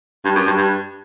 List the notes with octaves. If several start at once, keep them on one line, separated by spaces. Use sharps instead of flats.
G2
F#2
G2
G2